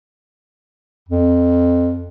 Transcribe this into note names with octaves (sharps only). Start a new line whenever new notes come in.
F2